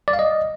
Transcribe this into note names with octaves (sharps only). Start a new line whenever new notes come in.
D5
F5
D#5